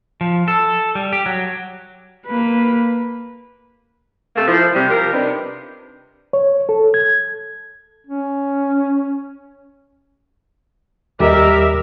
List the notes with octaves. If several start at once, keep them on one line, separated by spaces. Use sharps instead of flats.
F3
A4
G3
G4
F#3
A#3 B4
C3 A3 A#3
F3 E4
C3 G3
F3 G4 A#4
C3 B3 D4 D#4
C#5
A4
G#6
C#4
D#2 G3 G4 A#4 D#5 E5 D6